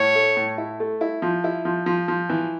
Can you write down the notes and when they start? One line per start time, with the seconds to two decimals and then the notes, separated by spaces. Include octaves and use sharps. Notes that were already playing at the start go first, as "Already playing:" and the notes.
Already playing: A2 C#5
0.15 A3
0.37 A2
0.58 E4
0.80 A3
1.01 E4
1.22 F3
1.44 E4
1.65 F3
1.86 F3
2.08 F3
2.29 E3